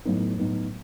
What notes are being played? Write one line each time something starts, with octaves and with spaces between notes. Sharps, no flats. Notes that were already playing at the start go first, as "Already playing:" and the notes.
A2 F#3 B3 D#4
A2 F#3 B3 D#4